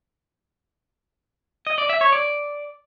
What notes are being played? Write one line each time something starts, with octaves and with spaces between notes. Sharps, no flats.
D#5
D5
E5
C#5
D5